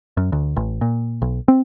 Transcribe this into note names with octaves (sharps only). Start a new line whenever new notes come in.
F#2
D2
A1
A#2
B1
C4